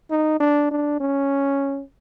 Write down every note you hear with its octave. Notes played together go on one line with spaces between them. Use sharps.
D#4
D4
D4
C#4